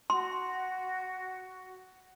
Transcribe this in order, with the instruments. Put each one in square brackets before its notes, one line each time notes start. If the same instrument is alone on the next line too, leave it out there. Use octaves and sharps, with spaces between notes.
[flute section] F#4 [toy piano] C6